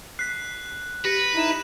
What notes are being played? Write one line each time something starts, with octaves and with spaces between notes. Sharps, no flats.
F#6 B6 C7
G4 B4 A#6 C#7
D#4 E4 D#7 E7